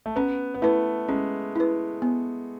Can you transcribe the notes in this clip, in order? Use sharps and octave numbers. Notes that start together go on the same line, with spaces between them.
A3
B3 C#4
B3
A3 E4 B4
G#3 C#4
E4 B4
B3